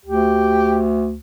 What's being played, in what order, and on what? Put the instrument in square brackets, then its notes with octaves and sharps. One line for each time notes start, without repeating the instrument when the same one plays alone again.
[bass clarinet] D2 [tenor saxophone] G4